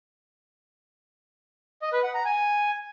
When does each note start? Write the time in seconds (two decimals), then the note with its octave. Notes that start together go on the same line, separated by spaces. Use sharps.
1.82 D#5
1.93 B4
2.04 F#5
2.14 A#5
2.25 G#5